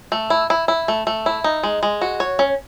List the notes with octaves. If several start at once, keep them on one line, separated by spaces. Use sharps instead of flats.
A3
E4
E4
E4
A3
A3
E4
D#4
G#3
G#3
F#4
C#5
C#4